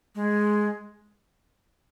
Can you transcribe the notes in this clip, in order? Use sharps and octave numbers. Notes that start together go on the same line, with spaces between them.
G#3